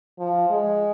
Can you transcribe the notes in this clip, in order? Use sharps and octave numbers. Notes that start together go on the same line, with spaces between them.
F3
G#3